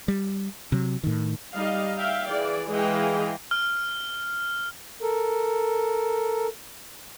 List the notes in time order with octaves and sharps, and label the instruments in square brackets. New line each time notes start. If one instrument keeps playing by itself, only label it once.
[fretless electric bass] G3
C3 F#3
A2 D#3
[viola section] G3 D#4 G4 D#5 F5
E5 F5 G5
E3 G#4 D5
E3 G#3 G#4 D#5 F5 G5
[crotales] F6
[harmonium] A4 A#4